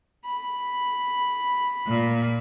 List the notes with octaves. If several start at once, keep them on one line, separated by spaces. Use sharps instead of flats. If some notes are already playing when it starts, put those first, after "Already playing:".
B5
A#2